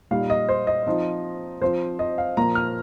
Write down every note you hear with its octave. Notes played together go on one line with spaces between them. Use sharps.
A#2 G3 D#4 F5
D#5
C5
D#5
F3 C4 D#4
F3 C4 F4 C5
D#5
F5
A#2 F3 A#3 A#5
F6